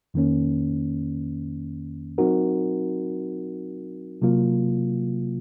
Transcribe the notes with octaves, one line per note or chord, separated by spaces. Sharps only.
F2 D#3 A#3 C#4
F#3 C4 D#4 F#4 A#4
C3 F#3 A#3 F4